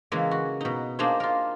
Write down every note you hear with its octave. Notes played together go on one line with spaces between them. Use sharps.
C#3 E3 G#3 A#3
F#4
B2 D#4
A#3 D4 D#4 G#4 C5
F4 A#4